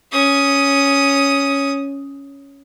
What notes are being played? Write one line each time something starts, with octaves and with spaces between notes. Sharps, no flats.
C#4 D#6